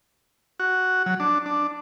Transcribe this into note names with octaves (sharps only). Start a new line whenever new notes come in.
F#4
F#3
D4
D4